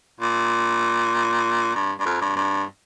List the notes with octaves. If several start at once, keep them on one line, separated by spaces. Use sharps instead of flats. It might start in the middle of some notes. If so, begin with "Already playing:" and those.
A#2
G2
G2
F2
G2
G2